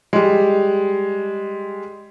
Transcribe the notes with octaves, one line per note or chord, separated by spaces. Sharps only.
G3 G#3